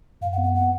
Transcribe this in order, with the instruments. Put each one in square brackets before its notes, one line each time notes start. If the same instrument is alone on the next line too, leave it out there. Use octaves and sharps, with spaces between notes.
[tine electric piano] F#2 [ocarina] F5
[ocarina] F#5
[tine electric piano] B3
[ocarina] F#5
[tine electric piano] B3 [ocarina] F#5